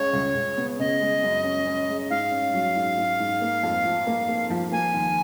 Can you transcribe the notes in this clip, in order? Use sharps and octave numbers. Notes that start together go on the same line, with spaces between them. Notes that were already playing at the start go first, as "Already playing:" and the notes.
Already playing: C#2 C#3 G#3 C#5
C#2
C#2
B3
C#3 D#5
G#3
F#2
C#4
C#4
G#3
G#2 F5
C#4
F#3
G#2
G#2
G#2
A#3
F2
F3
A#3
A#3
F3
A#3 G#5
D#2